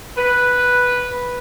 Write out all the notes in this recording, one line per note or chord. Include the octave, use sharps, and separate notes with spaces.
B4